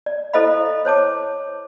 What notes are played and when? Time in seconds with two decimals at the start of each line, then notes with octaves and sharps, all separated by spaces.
0.06 D5
0.33 E4 A4 C5 D#5 F5 B5
0.85 C5 C#5 A5 D6